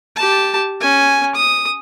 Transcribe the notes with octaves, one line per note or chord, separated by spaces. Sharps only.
G4 A5
C#4 G#5
D#6